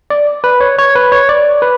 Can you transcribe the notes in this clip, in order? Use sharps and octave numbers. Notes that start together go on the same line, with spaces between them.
D5
B4
C#5
C#5
B4
C#5
D5
B4